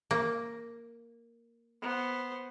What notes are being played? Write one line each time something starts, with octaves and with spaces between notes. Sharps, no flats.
A#3
B3 C5